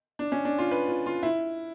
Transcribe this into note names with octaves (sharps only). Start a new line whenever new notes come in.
D4
C#4
D4
F4
B4
F4
F4
E4